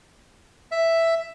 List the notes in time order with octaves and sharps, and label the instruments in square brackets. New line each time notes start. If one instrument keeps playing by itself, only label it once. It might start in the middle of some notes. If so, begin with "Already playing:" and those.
[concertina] E5